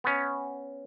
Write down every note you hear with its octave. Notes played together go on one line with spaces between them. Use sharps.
B3 C#4